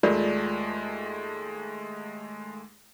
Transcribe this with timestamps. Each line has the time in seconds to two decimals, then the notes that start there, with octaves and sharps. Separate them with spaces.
0.03 D#2 G#3 A3 F4 A#4 D5